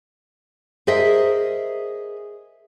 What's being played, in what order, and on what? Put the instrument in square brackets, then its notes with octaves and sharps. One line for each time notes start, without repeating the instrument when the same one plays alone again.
[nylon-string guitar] G#4 A#4 C5 D#5 E5